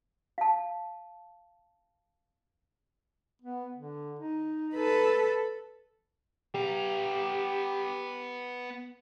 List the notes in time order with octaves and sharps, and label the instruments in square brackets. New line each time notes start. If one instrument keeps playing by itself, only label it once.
[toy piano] F5 A5
[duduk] B3
D3
D#4
[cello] A4 B4
[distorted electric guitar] B3 A#5 [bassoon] G4